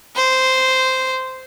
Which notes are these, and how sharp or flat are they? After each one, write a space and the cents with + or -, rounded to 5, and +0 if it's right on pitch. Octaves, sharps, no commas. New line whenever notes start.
C5 -10